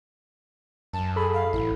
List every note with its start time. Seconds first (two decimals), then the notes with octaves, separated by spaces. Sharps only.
0.93 F#2 A5
1.16 G#4 A4 B5
1.34 F5
1.53 A1 E4